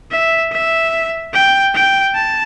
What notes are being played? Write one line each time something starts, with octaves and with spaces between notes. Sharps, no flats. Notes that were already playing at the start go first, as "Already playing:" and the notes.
E5
E5
G5
G5
A5